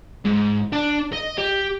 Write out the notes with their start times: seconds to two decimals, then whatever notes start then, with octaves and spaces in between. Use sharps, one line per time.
0.25 G#2
0.72 D4
1.13 D#5
1.38 G4